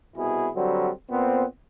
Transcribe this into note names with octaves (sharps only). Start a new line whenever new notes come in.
C2 B2 E4 G#4
D3 F#3 G3 C4
A#2 B3 C4